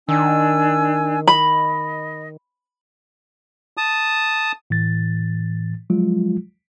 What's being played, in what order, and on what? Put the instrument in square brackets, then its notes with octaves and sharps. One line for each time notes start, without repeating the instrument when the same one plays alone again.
[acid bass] D#3 [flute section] D4 G#5 E6
[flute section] D#5 [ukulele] B5
[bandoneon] A5 D#6
[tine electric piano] A2 E3 A6
F3 F#3 G#3 F4